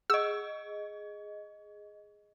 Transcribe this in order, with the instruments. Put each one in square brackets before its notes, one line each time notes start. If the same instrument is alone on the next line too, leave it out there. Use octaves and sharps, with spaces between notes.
[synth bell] G#4 D#5 [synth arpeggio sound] E6